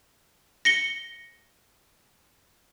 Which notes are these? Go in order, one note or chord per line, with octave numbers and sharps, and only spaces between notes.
A#6 C#7 G7